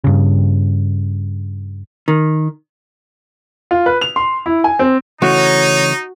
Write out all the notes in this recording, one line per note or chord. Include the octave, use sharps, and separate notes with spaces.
G2 C#3
D#3
F4
B4
F7
C6
E4
G#5
C4
C#3 E3 A3 D#4 F#4 C#5